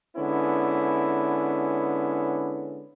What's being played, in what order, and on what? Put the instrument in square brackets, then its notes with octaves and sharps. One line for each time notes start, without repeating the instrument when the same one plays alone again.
[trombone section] D3 G#3 B3 C#4 E4